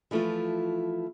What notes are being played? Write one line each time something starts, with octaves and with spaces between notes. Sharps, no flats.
E3 F3 A3 E4 F4